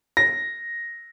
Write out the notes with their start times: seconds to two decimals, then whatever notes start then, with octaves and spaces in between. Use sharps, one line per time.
0.17 A#6